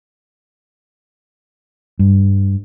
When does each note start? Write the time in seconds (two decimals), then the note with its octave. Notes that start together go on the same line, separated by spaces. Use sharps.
1.99 G2